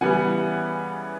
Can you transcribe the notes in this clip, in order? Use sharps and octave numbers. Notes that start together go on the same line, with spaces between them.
C#3 E3 G3 B3 F#5 G#5